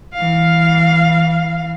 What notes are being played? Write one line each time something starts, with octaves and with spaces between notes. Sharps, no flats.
E3 F5